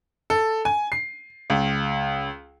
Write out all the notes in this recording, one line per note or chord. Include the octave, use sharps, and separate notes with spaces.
A4
G#5
C7
C#2